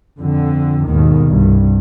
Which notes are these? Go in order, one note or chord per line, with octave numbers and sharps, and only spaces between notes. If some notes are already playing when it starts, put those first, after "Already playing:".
F2 D3
D#2 G#2 B2 D#3
C2 G2